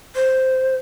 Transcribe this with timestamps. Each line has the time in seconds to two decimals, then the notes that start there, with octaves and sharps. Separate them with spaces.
0.15 C5